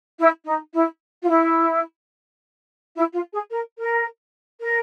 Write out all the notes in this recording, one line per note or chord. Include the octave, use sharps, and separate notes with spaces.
E4
D#4
E4
F4
E4
E4
F4
G#4
A#4
A#4
A#4